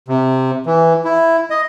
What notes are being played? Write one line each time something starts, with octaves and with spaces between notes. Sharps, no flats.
C3
E3
E4
D#5